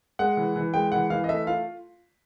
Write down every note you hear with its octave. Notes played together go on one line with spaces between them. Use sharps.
G#3 F#5
E3
E3
G#3 G5
E3 F#5
E3 F5
D#5
A3 E5
F4 F5